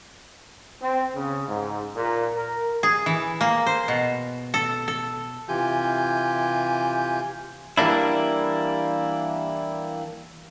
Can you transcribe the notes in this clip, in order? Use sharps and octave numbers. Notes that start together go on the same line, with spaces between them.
C4
C#3
G#2
A#2
A#4
G#4
E3
A#3
C5
B2
A4
A4
C3 E3 F4 G4 G#5 G6
E3 G3 A#3 D4 E4